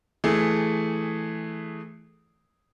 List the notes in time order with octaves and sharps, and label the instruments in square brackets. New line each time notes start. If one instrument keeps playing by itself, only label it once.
[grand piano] E3 A3 G#4